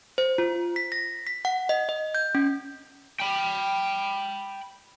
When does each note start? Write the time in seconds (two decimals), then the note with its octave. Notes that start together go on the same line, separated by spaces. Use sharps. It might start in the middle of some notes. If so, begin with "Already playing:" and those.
0.18 C5
0.38 F4
0.76 B6
0.92 A#6
1.27 B6
1.45 F#5
1.69 D#5
1.89 D#5
2.15 G6
2.35 C#4
3.20 G5 B5